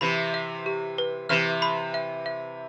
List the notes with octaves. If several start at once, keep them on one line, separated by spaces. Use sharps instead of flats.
C3 E3 B5
E5
G4
B4
C3 E3 F6
B5
E5
E5